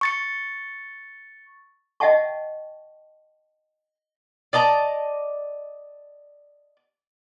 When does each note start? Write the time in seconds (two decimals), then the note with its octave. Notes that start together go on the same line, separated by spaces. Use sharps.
0.01 C#6 A6 C#7
2.00 D#5 E5 F#5 G5 A5 C#6
4.53 D5 D#5 A5 A#5